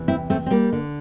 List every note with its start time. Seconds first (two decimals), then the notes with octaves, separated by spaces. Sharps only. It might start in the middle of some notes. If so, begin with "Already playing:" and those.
Already playing: E2 C3 E3
0.08 C4 E4
0.30 A3 C4
0.46 C4
0.50 G3 A#3
0.72 D3